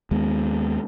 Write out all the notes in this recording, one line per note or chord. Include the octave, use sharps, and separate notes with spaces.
D#2 G#3 B3